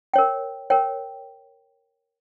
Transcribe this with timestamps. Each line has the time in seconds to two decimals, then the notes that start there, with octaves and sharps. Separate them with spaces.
0.14 A#4 C#5 G5
0.70 A#4 C#5 G5